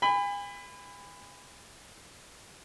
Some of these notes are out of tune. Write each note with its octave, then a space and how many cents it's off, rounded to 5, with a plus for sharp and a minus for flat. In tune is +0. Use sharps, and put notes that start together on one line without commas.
G#5 -40 B5 +20